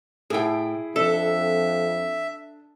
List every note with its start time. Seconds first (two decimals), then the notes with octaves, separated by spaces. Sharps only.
0.30 A2 E4 G#4 G5
0.96 F2 D4 A4 E5